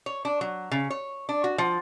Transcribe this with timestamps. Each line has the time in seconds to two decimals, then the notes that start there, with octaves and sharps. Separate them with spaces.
0.06 C#5
0.25 D4
0.41 F#3
0.71 C#3
0.90 C#5
1.29 D4
1.44 F#4
1.58 F3